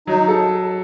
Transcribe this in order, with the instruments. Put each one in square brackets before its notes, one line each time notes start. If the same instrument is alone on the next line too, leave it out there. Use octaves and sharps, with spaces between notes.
[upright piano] F#3 [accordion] D#4
[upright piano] A4